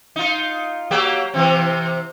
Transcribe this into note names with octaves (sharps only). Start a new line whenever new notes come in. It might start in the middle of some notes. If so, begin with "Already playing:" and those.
D#4 F4
F#3 A#3 G4
C3 E3 C4